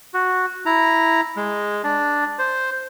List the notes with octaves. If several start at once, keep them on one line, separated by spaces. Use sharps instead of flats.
F#4
E4 A#5
G#3
D4
C5